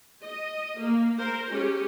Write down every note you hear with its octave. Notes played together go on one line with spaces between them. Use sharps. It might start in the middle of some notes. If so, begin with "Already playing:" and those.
D#5
A#3
A#4 C5
G#3 C#4 G4